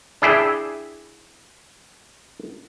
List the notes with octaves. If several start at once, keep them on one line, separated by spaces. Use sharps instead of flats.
D4 E4 G#4 E5 G5